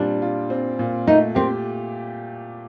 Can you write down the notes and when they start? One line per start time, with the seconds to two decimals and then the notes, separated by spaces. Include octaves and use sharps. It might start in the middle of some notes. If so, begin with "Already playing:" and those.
Already playing: A#2 G3 C4 D4 F4
0.22 F4
0.50 C4
0.79 A#2
1.07 A3 D#4
1.35 C4 G4